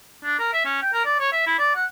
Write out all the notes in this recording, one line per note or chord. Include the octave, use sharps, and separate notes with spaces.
D4
A#4
E5
C#4
G5
A#4
D5
C#5
E5
E4
D5
F#5